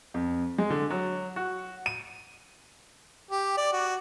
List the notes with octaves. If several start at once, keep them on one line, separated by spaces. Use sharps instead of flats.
F2
G#3
D3
F#3
F#4
D#7
G4
D5
F#4